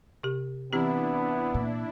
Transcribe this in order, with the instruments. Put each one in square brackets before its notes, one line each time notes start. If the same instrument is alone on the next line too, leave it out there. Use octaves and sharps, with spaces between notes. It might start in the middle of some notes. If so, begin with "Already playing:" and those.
[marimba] C3 G4
[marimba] E3 C4 G4 [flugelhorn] B3 [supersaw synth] D4 E4
[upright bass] A#2